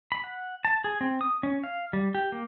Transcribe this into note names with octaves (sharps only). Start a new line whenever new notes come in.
B5
F#5
A5
G#4
C4
D#6
C#4
F5
G3
G4
A#3